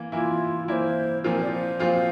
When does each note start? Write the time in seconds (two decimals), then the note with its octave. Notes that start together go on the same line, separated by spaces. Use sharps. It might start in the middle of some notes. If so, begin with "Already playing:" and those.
Already playing: E3 A#3
0.12 E3 A#3 E4 F4
0.68 E3 A#3 E4 C5 D5
1.24 A#2 F3 C4 F4 A#4
1.42 D5
1.52 C5
1.80 A#2 F3 C4 F4